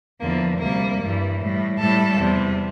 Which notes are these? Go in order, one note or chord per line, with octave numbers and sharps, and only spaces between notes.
E2 D3 F3 A#3
D2 C3 G3 A#3
G2 E3 G3
A2 G3
A2 G3 A4
E2 C3 G3